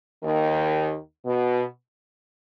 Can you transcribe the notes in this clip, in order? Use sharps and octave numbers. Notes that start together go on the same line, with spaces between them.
D#2 D#3
B2